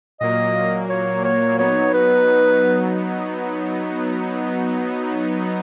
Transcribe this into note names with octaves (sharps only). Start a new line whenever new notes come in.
A#2 F#3 A#3 D#5
C#5
C#5
F#3 B3 D#4 C#5
B4